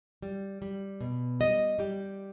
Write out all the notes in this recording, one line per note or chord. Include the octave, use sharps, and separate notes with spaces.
G3
G3
B2
G3 D#5
G3 G4